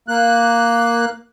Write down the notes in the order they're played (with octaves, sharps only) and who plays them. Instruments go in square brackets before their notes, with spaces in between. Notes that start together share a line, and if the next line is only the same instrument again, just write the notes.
[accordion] A#3 F#6